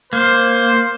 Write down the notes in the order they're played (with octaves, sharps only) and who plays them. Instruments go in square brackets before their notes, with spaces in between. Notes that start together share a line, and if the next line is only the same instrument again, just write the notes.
[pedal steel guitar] A#3 [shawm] C5